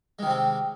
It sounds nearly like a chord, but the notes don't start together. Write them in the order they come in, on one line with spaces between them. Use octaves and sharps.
G#3 D#3 C3 C4